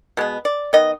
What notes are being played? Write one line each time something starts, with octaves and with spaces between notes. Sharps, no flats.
B2 G#3 B3
D5
D#3 B3 D#5